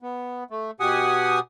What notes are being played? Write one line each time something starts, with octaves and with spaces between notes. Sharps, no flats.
B3
A3
B2 G4 F#5 G#5 D#6